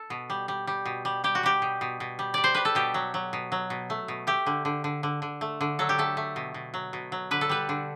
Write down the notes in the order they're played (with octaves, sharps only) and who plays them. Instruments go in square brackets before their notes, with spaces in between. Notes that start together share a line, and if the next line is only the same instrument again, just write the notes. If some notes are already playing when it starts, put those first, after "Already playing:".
Already playing: [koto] A4
B2
G3
G3
G3
B2
G3
G3 G4
F#4
G3 G4
B2
B2
B2
G3
G3 D5
C5
G3 B4
A4
B2 G4
F#3
F#3
B2
F#3
B2
A3
B2
A3 G4
D3
D3
D3
D3
D3
A3
D3
F#3 A4
G4
A3 A4
A3
B2
B2
F#3
B2
F#3
D3 B4
A4
G3 B4
D3